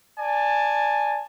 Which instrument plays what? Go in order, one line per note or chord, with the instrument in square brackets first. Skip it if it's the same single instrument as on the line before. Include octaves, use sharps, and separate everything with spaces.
[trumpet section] D5 G#5 A5